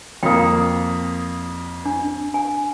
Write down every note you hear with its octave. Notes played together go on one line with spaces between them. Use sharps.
F2 A#3 G5 D#6
D4
G#5